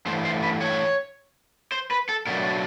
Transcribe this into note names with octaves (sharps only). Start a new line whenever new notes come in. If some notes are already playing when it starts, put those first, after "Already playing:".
G2 E3 A3 C5
C5
B4
C#5
C5
B4
A4
B2 F#3 A3 D4 A#4